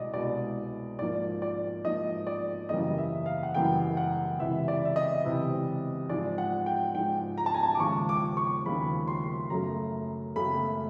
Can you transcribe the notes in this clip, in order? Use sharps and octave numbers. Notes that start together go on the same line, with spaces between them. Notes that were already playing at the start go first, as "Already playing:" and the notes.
Already playing: C2 B2 G#3 D5 D#5
C2 B2 G#3 D5
G#2 F3 A#3 D5
D5
G#2 F3 A#3 D#5
D5
F#2 C#3 E3 G3 A#3 D#5
E5
F5
F#5
F#2 C#3 E3 G3 A#3 G5
F#5
C#2 C3 E3 E5
D5
E5
D#5
C#2 C3 E3
G#2 F3 G#3 D5
F#5
G5
G#2 F3 G#3 G5
A#5
A5
G#5
A5
D6
D#2 C#3 F3 G#3 C#6
D6
C#6
D#2 C#3 F3 G#3 B5
C6
F#2 C#3 F#3 A3 A#5
F#2 C#3 F#3 A3 B5